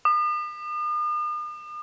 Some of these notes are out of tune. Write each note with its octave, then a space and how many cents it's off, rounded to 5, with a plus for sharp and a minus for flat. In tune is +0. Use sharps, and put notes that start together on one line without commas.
D#6 -45